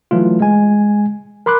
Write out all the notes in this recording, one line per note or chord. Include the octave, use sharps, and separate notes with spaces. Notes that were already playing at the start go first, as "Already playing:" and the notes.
E3 F#3 A3 F4
G#3 G#5
A#4 B5 C6 D6 F#6